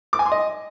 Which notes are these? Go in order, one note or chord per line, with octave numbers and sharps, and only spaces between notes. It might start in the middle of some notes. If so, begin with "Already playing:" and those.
D6
G#5
C6
D#5